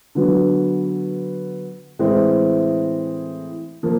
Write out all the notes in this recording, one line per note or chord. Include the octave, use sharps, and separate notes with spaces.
D3 F#3 B3
A2 E3 G#3 C4 E4
F3 A#3